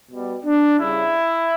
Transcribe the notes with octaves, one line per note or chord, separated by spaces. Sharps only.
B2 G3
D4
C#3 G3 E4